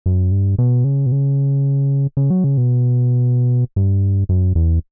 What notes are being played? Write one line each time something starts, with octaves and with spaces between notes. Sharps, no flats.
F#2
G2
B2
C#3
B2
C#3
C#3
F#3
C#3
B2
G2
F#2
E2